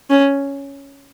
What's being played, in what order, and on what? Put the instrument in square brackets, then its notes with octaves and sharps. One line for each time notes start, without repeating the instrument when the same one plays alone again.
[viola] C#4